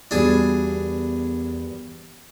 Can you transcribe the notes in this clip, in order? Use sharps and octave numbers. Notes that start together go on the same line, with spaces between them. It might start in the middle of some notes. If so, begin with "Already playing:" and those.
E2 G3 A#3 B3 D4 F#4 G#4